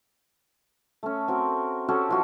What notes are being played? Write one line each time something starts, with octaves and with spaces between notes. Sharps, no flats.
A3 C#4
C4 F#4 A#4
C#4 F#4 G4 A4
E3 F3 F#4